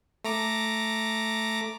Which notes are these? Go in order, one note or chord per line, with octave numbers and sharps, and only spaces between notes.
A3 A#5 D6